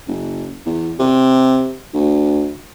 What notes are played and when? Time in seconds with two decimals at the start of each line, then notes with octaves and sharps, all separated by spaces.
0.07 F#1
0.66 E2
0.99 C3
1.94 D2